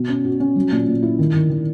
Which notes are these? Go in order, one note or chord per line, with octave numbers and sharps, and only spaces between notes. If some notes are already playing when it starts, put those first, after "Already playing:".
Already playing: B2
C#4
F#4
C#4
F#3
A#2
A#2
E4
D#3
D#3
D#3